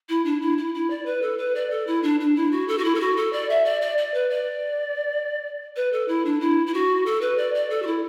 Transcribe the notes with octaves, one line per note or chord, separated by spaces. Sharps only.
E4
D4
E4
E4
E4
D5
B4
A4
B4
D5
A4
E4
D4
D4
E4
F#4
A4
F#4
E4
A4
F#4
A4
D5
E5
D5
D5
D5
B4
D5
B4
A4
E4
D4
E4
E4
F#4
A4
B4
D5
D5
A4
F#4
E4